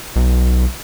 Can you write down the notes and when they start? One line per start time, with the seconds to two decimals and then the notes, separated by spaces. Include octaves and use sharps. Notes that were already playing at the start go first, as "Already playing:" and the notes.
0.16 B1